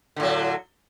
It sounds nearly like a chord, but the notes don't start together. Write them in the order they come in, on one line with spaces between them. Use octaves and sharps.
D3 A2 F#3